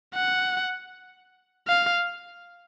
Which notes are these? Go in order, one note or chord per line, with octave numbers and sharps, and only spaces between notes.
F#5
F5